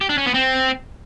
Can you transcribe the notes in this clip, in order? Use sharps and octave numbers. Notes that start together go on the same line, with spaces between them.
G4
D4
C#4
B3
C4